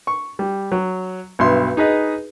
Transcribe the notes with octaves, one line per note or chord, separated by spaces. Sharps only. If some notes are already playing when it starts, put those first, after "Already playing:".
C#6
G3
F#3
B1 G2 E5 C6
D#4 G#4 B4 D#5